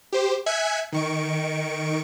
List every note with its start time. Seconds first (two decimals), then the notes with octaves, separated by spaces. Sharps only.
0.12 G4 C5
0.46 E5 G#5 F#6 G#6 B6 C#7
0.92 D#3 C#6 D7